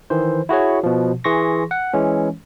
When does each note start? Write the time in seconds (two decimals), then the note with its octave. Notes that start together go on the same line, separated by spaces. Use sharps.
0.10 D#3 E3 C5
0.49 E4 F#4 G#4 C#5
0.83 B2 F3
1.24 E3 G#4 C6 C#6 A#6
1.71 F#5
1.93 E3 G#3 C#4